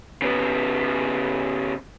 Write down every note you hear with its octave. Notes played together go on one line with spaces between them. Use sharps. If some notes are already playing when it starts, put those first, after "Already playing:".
C#3 B3